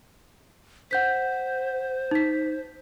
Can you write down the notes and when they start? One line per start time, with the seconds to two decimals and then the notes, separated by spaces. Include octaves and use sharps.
0.91 C5 F#5 G6 B6
2.11 D#4 B6